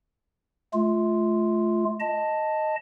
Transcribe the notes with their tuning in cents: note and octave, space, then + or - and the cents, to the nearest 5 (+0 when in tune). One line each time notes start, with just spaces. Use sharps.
A3 -30 F4 -5
D#5 +0 A5 +5